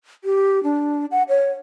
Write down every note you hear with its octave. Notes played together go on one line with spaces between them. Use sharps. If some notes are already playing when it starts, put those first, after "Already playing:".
G4
D4
F#5
C#5